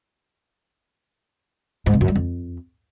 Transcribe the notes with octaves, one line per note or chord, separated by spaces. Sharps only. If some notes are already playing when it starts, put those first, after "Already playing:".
G#2
C3
F#2
G3
F2